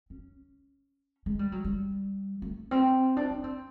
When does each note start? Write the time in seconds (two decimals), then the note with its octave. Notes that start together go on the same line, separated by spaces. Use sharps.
0.10 C#4
1.26 G#3
1.39 G3
1.52 F#3
1.64 G3
2.42 A3
2.71 C4
3.17 D4
3.31 C#4
3.44 C4